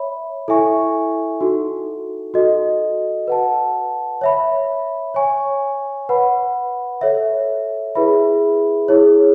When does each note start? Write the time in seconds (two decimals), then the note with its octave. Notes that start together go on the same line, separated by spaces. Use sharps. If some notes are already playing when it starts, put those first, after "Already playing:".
Already playing: C#5 E5 B5
0.48 E4 A4 E5 G#5 C#6
1.41 D#4 F#4 A4
2.34 F#4 A4 D#5
3.27 B4 F#5 A5
4.21 C#5 E5 B5
5.14 C#5 G#5 C#6
6.09 B4 F#5 B5
7.01 A4 C#5 E5
7.95 E4 G#4 B4 E5 B5
8.88 E4 G#4 C#5